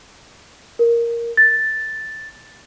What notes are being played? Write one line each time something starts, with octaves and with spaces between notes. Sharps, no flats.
A#4
A6